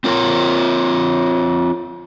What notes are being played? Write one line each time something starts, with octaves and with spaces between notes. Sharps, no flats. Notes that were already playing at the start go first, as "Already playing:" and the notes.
C4 F4 A#4 C#5